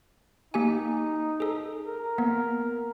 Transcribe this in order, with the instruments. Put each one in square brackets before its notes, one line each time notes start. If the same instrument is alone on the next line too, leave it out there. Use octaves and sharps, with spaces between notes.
[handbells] A#3 G4 G#5 [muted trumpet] D#4
[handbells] G#4 A4
[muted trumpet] A#4
[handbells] A#3 B3